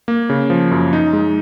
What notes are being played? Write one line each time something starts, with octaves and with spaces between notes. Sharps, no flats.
A#3
C#3
F3
F#2
D#4
G#3